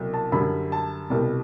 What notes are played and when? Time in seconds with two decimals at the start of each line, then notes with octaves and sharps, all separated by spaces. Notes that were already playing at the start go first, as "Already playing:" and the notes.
Already playing: C2 B2 F#3
0.14 A5
0.32 F#2 D3 G3 B5
0.72 A5
1.10 C2 B2 G3